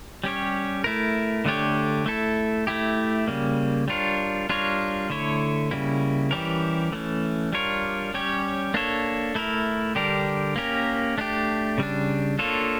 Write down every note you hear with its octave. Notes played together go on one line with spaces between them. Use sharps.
G3 C#4 G4 C#5
A3 E4 A#4
D3 A3 D4 G4 C#5
A3 E4 A4
A3 E4 G4
C#3 G3 A#3
G3 D4 F4 A#4 C#5
G3 D4 F4 A#4 C#5
D3 A3 E4 A4 C#5
C#3 G3 A#3 E4
E3 G3 C#4 G4 A#4
E3 A3 C#4
G3 D4 F4 A#4 C#5
G3 C#4 G4 C#5
A#3 D4 A4 C#5
A3 E4 A#4
D3 G3 D4 G4 A#4
A#3 C#4 G4 A#4
A3 D4 G4
C#3 G3 D4
A#3 D4 F4 A4 C#5